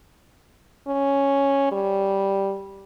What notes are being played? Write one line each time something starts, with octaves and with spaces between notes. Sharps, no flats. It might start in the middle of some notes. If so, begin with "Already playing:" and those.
C#4
G3